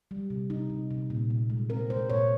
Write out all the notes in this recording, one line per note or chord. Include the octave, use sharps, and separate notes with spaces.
G3
C3
C3 D#4
C3
C3
A#2
A#2
G#3
C4 A#4
G#3 C5
A#2 C#5